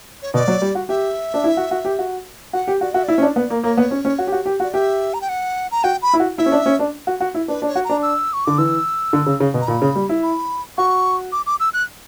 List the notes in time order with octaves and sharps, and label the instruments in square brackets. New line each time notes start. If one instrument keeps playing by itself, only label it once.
[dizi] C#5
[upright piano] B2 [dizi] D5
[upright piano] F#3
G3
F#4
[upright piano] G4 [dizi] E5
[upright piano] D4
E4
F#4
F#4
G4
F#4
[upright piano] F#4 [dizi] F#5
[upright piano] G4
[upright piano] F#4 [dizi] D5
[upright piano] F#4 [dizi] E5
[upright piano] E4 [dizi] D5
[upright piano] C#4 [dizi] E5
[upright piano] D4
[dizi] D5
[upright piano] B3
A#3
[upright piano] A#3 [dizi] C#5
[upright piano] B3
C#4
C#4
F#4
G4
F#4
G4
F#4
[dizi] D5
[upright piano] G4 [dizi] E5
[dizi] A#5
G5
F#5
A#5
[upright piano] F#4 [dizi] G5
[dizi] B5
[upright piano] E4
F#4
[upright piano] E4 [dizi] E5
[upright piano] C#4
D4
C#4
D4
F#4
F#4
E4
[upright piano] D4 [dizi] B4
[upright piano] D4
[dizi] C#5
[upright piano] F#4
[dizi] A#5
[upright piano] D4
[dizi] E6
C#6
[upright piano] D3 [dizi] D6
[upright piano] E3 [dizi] E6
[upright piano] D3
C#3
C#3
B2
[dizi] A#5
[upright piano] A#2 [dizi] B5
[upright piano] C#3
G3
E4
[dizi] B5
[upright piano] F#4 [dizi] C#6
[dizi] D6
D6
E6
F#6